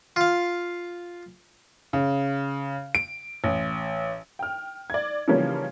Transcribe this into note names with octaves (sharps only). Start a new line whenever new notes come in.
F4 F5
C#3
D7
A1
G5 F6
D5 G#6
C#3 E3 F3 G3 A#3 C#4